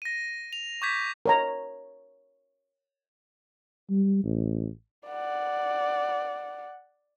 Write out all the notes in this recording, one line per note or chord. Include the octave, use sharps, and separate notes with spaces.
A#6 D#7
F7
C#6 D6 G6 G#6 B6
A#4 C#5 A#5
G3
A1
D5 F#5